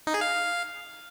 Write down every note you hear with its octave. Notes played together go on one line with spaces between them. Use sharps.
D#4
G#4
F5